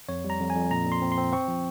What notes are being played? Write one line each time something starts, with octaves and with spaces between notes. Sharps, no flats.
F2 C#5
G3
A#5
F2
G#5
F2
A#2 A#5
A#2
C6
C4
C6
C4
C4 C#6
F3